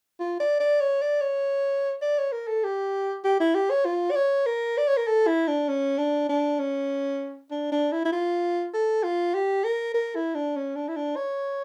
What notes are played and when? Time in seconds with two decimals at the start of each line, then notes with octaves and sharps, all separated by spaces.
0.19 F4
0.40 D5
0.60 D5
0.80 C#5
1.01 D5
1.21 C#5
2.02 D5
2.18 C#5
2.32 A#4
2.48 A4
2.64 G4
3.24 G4
3.40 E4
3.55 G4
3.71 C#5
3.85 F4
4.11 D5
4.16 C#5
4.46 A#4
4.78 D5
4.88 C#5
4.97 A#4
5.07 A4
5.27 E4
5.48 D4
5.69 C#4
5.98 D4
6.29 D4
6.59 C#4
7.51 D4
7.72 D4
7.92 E4
8.05 E4
8.12 F4
8.74 A4
9.03 F4
9.34 G4
9.64 A#4
9.94 A#4
10.15 E4
10.35 D4
10.56 C#4
10.76 D4
10.88 E4
10.96 D4
11.16 C#5